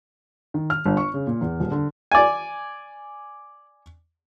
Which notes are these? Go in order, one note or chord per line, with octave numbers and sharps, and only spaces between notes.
D#3
F6
G1
C#6
C#3
A#2
E2
D#1
D3
D5 G#5